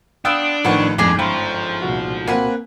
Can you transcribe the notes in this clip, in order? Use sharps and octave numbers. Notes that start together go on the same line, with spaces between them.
B3 D4 F4 G5 D#6 E6 F#6
A1 A2 D#3 F3 B4 F#5 A5 C#6
G1 F2 G#2 D4 G#4 G#5
F3 C#4 E4 G5 A#5 C6
C2 A#2 F#4
A#3 C4 B4 F#5 G#5